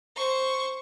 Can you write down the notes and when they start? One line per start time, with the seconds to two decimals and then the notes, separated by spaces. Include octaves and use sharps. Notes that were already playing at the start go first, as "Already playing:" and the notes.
0.16 C5 C#6